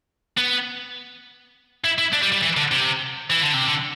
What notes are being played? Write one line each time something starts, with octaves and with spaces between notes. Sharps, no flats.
B3
E4
E4
D4
G3
G3
E3
D3
C3
E3
D3
C3
D3